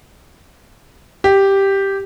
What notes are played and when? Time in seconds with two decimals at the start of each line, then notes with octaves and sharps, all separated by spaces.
1.24 G4